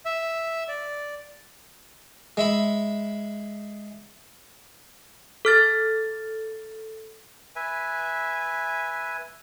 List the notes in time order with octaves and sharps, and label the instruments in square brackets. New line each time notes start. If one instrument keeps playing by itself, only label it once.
[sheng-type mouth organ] E5
D5
[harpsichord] G#3 E5 B5
[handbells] A4 F6 A6
[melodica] B4 E5 G#5